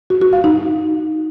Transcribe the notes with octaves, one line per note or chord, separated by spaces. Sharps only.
F#4
F#4
F5
D#4